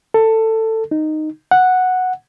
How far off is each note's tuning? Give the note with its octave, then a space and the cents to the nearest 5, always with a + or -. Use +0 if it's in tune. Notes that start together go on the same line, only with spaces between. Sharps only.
A4 +15
D#4 -10
F#5 -5